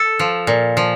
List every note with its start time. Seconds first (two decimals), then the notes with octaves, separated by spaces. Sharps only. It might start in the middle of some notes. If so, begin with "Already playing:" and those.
Already playing: A4
0.19 F3
0.47 A#2
0.77 F3